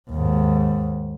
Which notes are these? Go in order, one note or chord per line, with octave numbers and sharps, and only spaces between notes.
D#2 G#2